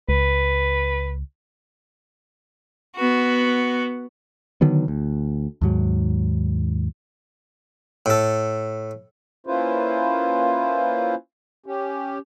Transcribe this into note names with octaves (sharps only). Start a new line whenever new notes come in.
C#2 B4
B3 F#4
D3 D#3 F#3 B3
D2
D#2 G#2 F#3
A2 A4
A#3 C#4 E4 F4 B4 C5
C#4 G4